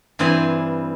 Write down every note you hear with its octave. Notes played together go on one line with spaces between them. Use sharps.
G2 E3 C4 E4 G#5